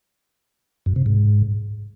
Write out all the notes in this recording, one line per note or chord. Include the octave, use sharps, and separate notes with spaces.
F#2
C3
G#2